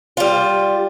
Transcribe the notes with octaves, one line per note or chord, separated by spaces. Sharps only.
G3 F4